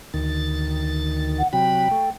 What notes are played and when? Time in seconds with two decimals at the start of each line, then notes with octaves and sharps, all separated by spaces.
0.14 D2 D#3 A6
1.39 F#5
1.53 C3 F#3 G5 B5
1.91 A3